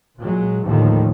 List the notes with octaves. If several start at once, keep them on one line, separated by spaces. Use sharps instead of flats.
A#2 F#3 G#3
D#2 A2 D3 D#3 F3